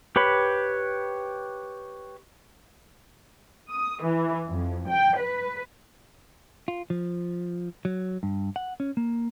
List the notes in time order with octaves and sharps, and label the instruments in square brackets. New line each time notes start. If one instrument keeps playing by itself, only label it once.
[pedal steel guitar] G4 B4 C#5 B5
[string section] D#6
E3
F2
G5
B4
[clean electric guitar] F4
F3
F#3
G2
F#5
C#4
A#3